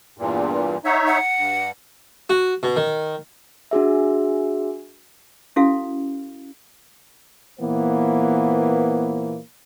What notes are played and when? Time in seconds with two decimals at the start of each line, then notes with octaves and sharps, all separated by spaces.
0.18 E2 G2 A#2
0.85 D#4 C#5 E5 F#5
1.06 F#5
1.38 G2
2.30 F#4
2.63 B2
2.76 D#3
3.71 D4 F#4 G#4 E5
5.56 C#4 E4 F#4 A4 F5
7.60 A#2 E3 A#3 B3 C5